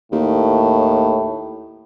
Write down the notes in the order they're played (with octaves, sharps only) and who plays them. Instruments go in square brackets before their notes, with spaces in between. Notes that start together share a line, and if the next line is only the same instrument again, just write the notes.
[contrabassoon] D#2 [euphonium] A2